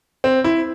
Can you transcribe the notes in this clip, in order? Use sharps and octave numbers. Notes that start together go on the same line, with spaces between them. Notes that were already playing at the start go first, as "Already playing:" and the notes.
C4
E4